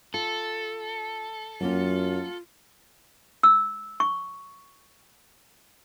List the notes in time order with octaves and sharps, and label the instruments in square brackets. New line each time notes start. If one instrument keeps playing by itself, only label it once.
[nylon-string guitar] F4 [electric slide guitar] A4
[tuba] F#2 [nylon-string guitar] F#3 A#3 C#4 [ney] F4
[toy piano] E6
C#6